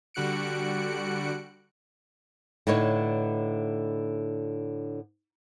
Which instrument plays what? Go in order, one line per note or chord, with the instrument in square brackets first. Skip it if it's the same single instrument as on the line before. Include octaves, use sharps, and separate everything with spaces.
[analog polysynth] D3 G3 F#4 F#6 C#7 D7
[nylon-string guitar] A2 D3 D#4 B4 C#5